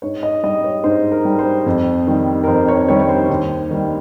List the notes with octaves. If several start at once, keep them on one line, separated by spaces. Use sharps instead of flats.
G#2 C#5
D#5
G3 D#5
C#5
G#2 C5
A#4
G3
C5
F2
D#3 G3
A#4
F2 C5
C#5
D#3 G3 C#5
C#5
C5
D#2
D#3 G3